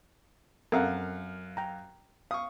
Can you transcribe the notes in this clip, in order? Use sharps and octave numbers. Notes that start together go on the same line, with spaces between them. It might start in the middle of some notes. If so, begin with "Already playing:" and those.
F#2 C4 A4 A#4 F5 F#5
G5 A#5
F5 C#6 D#6